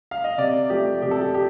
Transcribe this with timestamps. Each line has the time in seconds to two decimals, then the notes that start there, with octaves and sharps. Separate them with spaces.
0.11 F5
0.24 D#5
0.38 C3 D5
0.70 F3 A3 G4
1.02 C3 G4
1.11 A4
1.21 G4
1.34 G4